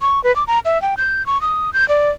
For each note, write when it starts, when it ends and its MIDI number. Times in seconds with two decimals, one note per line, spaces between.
0.02 0.22 85
0.24 0.34 71
0.36 0.44 86
0.48 0.59 82
0.65 0.81 76
0.82 0.95 79
0.97 1.25 91
1.26 1.40 85
1.41 1.70 87
1.73 1.88 91
1.89 2.10 74